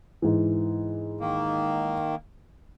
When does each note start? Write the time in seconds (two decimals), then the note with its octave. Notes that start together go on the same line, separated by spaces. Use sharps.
0.22 G#2 E3
1.21 D#3 A#3